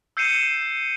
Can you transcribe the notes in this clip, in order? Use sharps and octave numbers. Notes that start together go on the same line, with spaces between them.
E6 G6 C7 C#7 D#7 E7